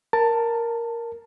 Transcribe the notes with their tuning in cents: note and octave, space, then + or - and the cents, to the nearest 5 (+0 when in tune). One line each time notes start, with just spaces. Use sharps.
A#4 +0 A5 +15